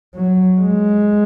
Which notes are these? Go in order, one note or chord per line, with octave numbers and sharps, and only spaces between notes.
F#3
G#3